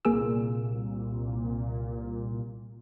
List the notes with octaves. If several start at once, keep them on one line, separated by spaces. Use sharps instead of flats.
C2 A#2 A#3 G#4 E6